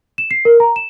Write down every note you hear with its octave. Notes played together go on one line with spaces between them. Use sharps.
E7
C7
A#4
A#5
E7